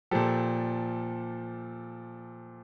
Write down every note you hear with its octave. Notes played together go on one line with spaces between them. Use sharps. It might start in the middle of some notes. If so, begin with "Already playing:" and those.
A#2 F3 G4 A4